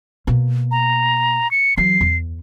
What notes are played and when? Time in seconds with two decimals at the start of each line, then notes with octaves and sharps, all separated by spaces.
0.27 B2 A#3
0.71 A#5
1.51 C#7
1.77 E3 F#3 C7
2.01 E2